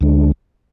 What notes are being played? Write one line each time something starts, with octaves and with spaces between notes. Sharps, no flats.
D2 D3 G#3 D4